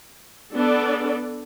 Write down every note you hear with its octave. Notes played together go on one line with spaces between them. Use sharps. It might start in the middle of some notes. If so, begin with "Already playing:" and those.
B3 D4 A4 D5